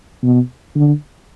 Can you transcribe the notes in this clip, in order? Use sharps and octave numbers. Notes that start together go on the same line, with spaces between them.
B2
D3